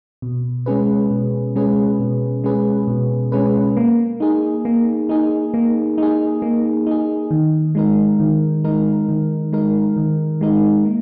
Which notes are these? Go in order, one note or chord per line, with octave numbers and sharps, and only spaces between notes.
B2
G#3 C#4 G#4 B4
B2
G#3 C#4 G#4 B4
B2
G#3 C#4 G#4 B4
B2
G#3 C#4 G#4 B4
A#3
D#4 G#4
A#3
D#4 G#4
A#3
D#4 G#4
A#3
D#4 G#4
D#3
G#3 D#4 A#4
D#3
G#3 D#4 A#4
D#3
G#3 D#4 A#4
D#3
G#3 D#4 A#4
A#3